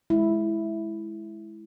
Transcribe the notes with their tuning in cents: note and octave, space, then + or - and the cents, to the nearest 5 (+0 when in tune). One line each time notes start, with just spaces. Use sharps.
G#3 +20 E4 +0